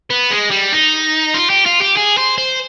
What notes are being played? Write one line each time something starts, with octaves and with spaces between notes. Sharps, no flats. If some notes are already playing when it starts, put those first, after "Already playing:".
B3
G#3
G3
D#4
F4
G4
F4
G4
G#4
C5
C5